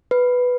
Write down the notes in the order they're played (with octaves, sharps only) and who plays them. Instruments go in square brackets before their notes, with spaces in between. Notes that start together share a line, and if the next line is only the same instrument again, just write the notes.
[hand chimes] B4